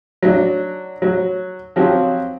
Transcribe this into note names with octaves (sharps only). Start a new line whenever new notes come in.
F#3 D4
F#3
F3 F#3 C4 G4